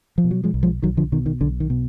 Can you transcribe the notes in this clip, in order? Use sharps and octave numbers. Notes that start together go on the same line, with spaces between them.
F3
B2
F#3
F3 G#3
B1
F3 G#3
B1 D#3 F#3
D3 F3
B2 D#3
D#3
B1 D3
D#3
B2